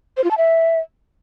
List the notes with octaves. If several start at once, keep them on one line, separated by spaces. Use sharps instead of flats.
C5
F4
A5
E5